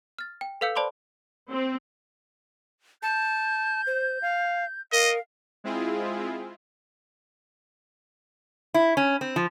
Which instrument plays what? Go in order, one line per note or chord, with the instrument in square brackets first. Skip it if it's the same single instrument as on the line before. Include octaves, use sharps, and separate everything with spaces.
[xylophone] F6 A6
G5
A4 B4 F5 E6 G6 C#7
C5 D5 A5 B5 C6 D6
[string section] C4
[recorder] A5 [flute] G6
[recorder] C5
F5
[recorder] A#4 [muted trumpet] D#5 [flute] F5
[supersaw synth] G#3 C4 E4 F4 G#4
[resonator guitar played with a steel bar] E4
C#4
C4
F3